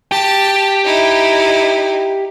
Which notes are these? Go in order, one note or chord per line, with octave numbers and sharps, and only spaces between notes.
G4 G5 A5
D#4 E4